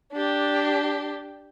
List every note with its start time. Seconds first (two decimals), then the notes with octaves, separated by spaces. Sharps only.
0.13 D4 G4